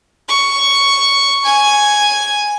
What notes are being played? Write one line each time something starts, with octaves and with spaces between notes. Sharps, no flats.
C#6
G#5